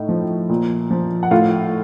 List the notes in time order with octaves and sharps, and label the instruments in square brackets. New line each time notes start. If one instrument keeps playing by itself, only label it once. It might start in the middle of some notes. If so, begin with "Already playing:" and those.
Already playing: [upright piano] A2 D#4
F3
A#2
F3
F#5
A2 F4 F5